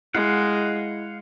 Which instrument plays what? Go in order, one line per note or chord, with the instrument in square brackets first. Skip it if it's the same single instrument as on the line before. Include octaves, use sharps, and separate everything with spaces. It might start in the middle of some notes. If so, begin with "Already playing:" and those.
[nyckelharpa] G#3 [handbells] E4 D#5 [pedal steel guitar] F5 F#5